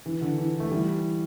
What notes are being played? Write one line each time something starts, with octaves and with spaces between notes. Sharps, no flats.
E3
D3
E3
A3
E3 G3